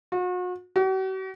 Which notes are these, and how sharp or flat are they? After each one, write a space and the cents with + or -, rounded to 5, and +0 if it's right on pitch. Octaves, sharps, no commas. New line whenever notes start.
F#4 -40
F#4 +45